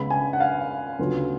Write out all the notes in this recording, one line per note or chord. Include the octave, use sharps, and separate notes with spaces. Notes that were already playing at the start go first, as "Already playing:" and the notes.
Already playing: C#2 C#3 G#3 B3 B5
G#5
F#5
F5
D2 C#3 F#3 B3 F4